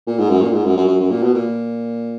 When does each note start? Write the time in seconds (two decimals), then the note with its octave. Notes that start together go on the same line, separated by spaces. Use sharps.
0.07 A#2
0.19 G#2
0.29 F#2
0.41 A#2
0.53 G#2
0.65 F#2
0.77 F#2
0.88 F#2
1.00 F#2
1.10 A#2
1.23 B2
1.34 A#2